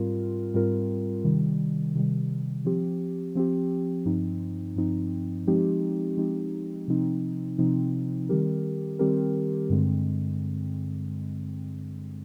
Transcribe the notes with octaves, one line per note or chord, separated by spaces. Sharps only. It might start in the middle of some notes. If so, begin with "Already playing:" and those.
Already playing: G#2 G3 C4 F4 A#4
G#2 G3 C4 F4 A#4
C3 D#3 G3
C3 D#3 G3
F3 C4 G4
F3 C4 G4
G2 F3 C4 D#4
G2 F3 C4 D#4
F3 G#3 C4 D#4 G4
F3 G#3 C4 D#4 G4
C3 F3 C4 D#4
C3 F3 C4 D#4
D#3 G3 C4 G4 A#4
D#3 G3 C4 G4 A#4
G2 D3 G#3 C4